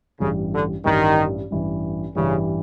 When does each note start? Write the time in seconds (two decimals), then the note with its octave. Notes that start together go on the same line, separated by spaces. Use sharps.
0.20 A1 G2 C#3 E3 G3
0.53 D3
0.85 A1 G2 D#3 E3 G3
1.51 A1 G2 E3 G3
2.15 A1 G2 C#3 E3 G3